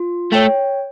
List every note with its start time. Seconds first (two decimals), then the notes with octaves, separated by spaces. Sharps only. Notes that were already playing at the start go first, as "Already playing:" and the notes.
Already playing: F4
0.32 A3 C#5 G5